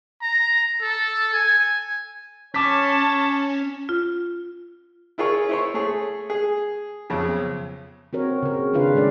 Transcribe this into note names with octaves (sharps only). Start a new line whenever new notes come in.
A#5
A4
G#5
C#4 C#5 A5 D6 B6
F4
E4 F4 G#4 A#4 C#5
E4 C5 C#5
A3 G#4 C#5
G#4
B1 F2 C#3
C4 F#4 A#4 C#5
C#3 A#4
D#3 D4 F4 B4 F5
G#3 C#4 A4 D5